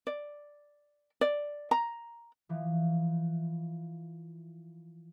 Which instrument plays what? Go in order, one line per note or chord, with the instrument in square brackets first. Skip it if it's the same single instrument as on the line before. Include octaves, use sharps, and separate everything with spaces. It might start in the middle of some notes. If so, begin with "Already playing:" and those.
[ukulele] D5
D5
A#5
[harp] E3 F3